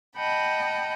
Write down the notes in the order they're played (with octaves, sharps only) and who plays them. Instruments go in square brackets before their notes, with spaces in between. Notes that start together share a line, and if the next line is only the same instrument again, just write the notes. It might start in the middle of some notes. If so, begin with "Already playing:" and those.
[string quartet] D#5 F#5 G5 A5 B5